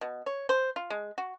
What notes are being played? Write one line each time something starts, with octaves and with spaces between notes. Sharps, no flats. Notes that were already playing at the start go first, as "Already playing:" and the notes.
B2
C#5
C5
F4
G#3
F#4